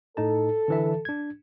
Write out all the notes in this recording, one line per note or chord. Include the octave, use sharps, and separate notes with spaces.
A2 D#4 A4 A5
D3 E3 E5
D4 G#6